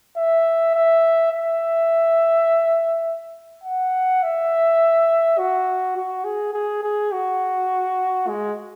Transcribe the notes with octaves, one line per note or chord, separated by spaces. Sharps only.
E5
E5
E5
F#5
E5
F#4
F#4
G#4
G#4
G#4
F#4
G#3